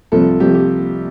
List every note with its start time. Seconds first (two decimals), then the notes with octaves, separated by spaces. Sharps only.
0.12 C2 C3 F3 A4
0.40 C2 C3 F3 G4
0.55 G4